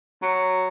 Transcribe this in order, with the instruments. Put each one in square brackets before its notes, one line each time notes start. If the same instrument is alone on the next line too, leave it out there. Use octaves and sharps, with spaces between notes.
[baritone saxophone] F#3